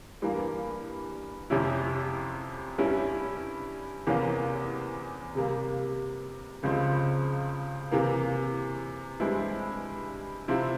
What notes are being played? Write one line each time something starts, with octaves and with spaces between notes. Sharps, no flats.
G2 E3 A#3
F2 C3 G3 C#4 E4
G2 G3 C#4 E4
E2 C3 E3 A#3 C#4
C3 G3 A#3
C#2 C#3 F3 C4
C3 E3 A#3
G2 E3 G#3 C4 E4
C3 F3 C4 E4